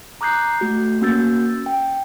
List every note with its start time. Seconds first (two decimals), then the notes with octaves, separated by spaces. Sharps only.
0.21 A#5 D6 D#6 F#6 G6 C7
0.60 A3 F#4 G6
1.01 A#3 C#4 F#4 E6 G6 A6
1.66 G5